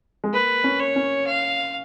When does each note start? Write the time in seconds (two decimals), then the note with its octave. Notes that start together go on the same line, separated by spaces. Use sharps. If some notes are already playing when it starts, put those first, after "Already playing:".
0.24 G#3
0.33 A#3 B4
0.64 C#4
0.79 C#5
0.96 C#4
1.26 F5